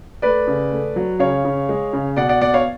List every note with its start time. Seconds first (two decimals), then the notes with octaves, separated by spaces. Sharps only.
0.22 A3 B4 D5
0.47 C#3
0.71 A3
0.96 F#3
1.19 C#3 C#5 F5
1.45 C#3
1.69 G#3
1.93 C#3
2.16 B2 D5 F#5
2.29 D5 F#5
2.41 B2 D5 F#5
2.54 C#5 F5